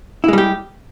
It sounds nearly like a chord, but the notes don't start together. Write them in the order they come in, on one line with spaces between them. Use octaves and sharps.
E4 G#3 G3 G4